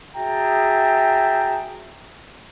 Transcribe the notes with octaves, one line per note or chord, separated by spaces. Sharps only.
F#4 G#4 E5 G5 A5 A#5